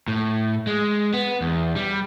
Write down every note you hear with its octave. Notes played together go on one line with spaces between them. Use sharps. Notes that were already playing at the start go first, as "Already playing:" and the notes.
A2
G#3
B3
E2
G3